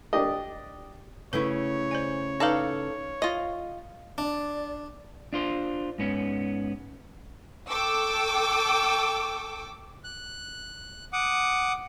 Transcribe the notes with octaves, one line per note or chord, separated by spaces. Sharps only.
D4 G4 D5 D#5
C#3 A3 E4 B4 C#5
C5 D5 G#5
D#4 A4 B4 D5 F5
F4 D#5
D4 D5
D4 F4 C5
G#2 B3 C#4
A4 G5 C#6 D6 E6
F#6
F#5 D6 D#6